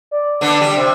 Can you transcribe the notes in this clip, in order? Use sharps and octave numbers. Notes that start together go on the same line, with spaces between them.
D5
D3 B3 D4
G3
C3 C5